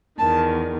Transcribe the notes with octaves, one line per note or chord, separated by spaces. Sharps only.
E2 D#3 A5